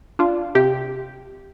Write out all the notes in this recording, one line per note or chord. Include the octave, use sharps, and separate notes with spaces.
D4 F4
C3 G4